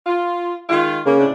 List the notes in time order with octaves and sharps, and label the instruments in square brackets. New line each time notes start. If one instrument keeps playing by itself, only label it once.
[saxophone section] F4
D#3 G#3 F4
[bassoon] C#3 [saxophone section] A#3
[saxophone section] A2 C3 D4